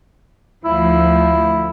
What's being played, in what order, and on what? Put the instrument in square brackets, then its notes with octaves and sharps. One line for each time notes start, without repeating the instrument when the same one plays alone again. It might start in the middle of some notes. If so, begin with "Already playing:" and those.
[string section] D2 F3 [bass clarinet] E4